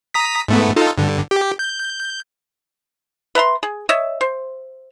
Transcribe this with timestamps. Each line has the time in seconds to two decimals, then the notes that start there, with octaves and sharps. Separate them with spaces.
0.14 A#5 D#6 B6
0.48 G#2 A3 B3
0.76 D#4 F4 A4
0.98 G2 D3
1.31 G4
1.59 G6
3.35 B4 E5 A#5 C6
3.63 G#4
3.89 C#5 D#5 E5
4.21 C5